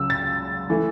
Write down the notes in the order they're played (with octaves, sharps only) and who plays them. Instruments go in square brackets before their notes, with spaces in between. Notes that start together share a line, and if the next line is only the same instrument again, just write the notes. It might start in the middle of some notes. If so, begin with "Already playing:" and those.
Already playing: [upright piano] C#2 C#3 F#3 E6
A6
E3 A3